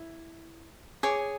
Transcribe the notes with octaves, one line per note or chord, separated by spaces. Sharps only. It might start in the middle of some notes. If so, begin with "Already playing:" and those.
Already playing: E4
G#4 C#5 D6